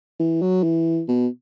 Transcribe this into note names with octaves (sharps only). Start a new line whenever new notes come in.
E3
F#3
E3
B2